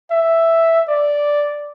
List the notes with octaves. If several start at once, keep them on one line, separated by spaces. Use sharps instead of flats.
E5
D5